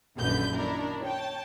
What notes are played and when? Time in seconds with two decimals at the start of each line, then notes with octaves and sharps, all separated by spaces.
0.18 A#1 F#2 D3 D#3 B4 G6
0.54 D#3 D4 E4 A#4
1.04 C#5 G5 A5